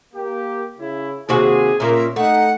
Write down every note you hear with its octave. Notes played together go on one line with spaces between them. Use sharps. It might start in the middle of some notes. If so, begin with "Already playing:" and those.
A#3 G4
C#3 E4
D#2 C3 F#4 G#4
A#2 C#3 A#4 E5
A3 D#4 F#5